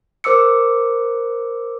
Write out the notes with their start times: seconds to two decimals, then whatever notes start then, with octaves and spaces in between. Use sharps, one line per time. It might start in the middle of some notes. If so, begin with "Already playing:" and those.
0.24 A#4 C5 D6 E6 C#7